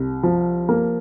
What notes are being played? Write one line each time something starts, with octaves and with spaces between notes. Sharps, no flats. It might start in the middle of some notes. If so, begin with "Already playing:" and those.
Already playing: C2
F3
A#3